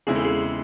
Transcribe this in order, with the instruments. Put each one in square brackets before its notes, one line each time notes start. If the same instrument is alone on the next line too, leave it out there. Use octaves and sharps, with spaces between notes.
[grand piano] E2 C#3 G#3 C4 E4 [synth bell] G#4
[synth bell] A4
G#4